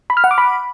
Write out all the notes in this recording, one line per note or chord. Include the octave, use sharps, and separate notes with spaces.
B5
F6
F#5
D6
B5